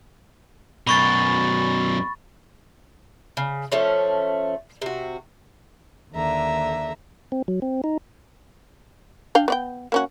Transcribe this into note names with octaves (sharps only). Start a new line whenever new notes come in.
F#2 B2 B5 C#6 A6
C#3
F3 A3 C#4
C3 F#4
D#2 D3 E5 A#5
C4
F#3
C4
D#4
D4 F5 G5
B3 D5 G5
A#3 C#4 F#4